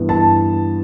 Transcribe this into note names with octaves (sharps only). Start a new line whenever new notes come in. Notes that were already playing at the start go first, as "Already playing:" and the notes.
Already playing: G2 E3 B3
A5